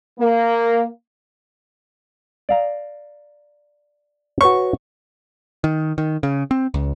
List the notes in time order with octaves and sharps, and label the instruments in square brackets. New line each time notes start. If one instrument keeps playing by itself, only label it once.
[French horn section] A#3
[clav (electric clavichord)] D5 F5 A#5
[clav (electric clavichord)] F#4 B4 C#5 [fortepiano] C#6
[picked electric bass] D#3
D#3
C#3
C4
C#2